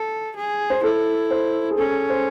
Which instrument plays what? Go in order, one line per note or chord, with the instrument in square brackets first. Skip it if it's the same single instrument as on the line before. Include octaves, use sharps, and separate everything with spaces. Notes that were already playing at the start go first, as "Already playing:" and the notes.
Already playing: [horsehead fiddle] A4
G#4
[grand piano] C5
[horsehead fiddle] E4 [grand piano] A4
[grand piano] C5
G#4
[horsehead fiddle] C#4 [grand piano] A4
[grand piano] C5